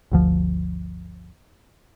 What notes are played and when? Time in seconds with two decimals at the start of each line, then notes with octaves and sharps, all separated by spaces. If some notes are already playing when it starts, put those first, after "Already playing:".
0.11 G1 D2 F3